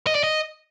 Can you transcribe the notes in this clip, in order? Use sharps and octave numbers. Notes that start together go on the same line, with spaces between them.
D#5
D5
D#5